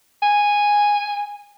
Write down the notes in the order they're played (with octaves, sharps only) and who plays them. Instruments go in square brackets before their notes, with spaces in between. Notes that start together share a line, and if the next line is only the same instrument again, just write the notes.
[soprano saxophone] G#5